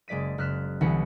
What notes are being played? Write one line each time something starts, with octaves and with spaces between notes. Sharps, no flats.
F#1 G#3 D5 B6 D#7
F#1 F6 F#6 B6 E7
C2 D3 E3 B3 F#5